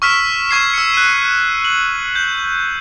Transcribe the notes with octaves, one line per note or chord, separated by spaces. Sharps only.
C#6 E6 F6 B6 E7
C#6 G#6 C7 E7
E6 C#7
F#6 D#7
F#7
G6